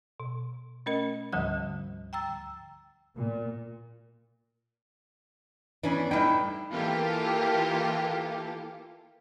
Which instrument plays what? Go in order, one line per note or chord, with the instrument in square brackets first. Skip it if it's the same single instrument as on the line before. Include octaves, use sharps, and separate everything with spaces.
[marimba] B2
A3 C#4 A#4 D#5
D2 G#2 D3 F3 G3 F#5
G5 A#5 E6 A6
[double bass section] A#2
[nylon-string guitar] E3 [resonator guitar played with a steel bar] B3 C#4 D4
[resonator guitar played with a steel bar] A2 G3 G5 [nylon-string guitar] D#4 E4
[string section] E3 A#3 F4 G4 A4